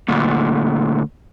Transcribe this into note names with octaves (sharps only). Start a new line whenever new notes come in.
D2 A#2